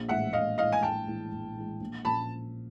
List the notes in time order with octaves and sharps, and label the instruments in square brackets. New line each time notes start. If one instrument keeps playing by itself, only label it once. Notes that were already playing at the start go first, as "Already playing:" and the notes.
Already playing: [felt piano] A#1
[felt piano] A2 E3 G#3 [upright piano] E5 F#5
[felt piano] A#1 [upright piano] D#5 F5
[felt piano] A2 E3 G#3 [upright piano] D#5 F5
[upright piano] G#5
[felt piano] A#1 [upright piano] G5 A5
[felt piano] A2 E3 G#3
A#1
A2 E3 G#3
A#1
[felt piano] A#2 F3 A#3 C#4 [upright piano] A5 B5